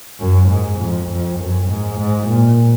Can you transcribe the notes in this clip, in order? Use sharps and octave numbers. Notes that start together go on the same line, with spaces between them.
F#2
G#2
F2
F2
F#2
G#2
G#2
A#2